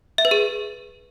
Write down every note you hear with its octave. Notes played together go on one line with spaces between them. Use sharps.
E5
B4
G#4